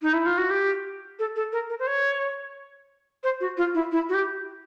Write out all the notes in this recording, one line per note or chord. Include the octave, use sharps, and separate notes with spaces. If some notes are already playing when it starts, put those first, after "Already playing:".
D#4
E4
F4
F#4
G4
A4
A4
A#4
A#4
C5
C#5
C5
F#4
F4
E4
E4
F#4
G4